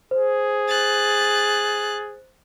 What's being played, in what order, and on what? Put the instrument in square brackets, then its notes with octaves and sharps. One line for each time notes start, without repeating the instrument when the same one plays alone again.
[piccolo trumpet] G#4 [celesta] C5
[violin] F#6 A6